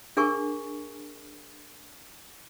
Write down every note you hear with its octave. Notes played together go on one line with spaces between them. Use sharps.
D4 G#4 A#4 G#5 C#6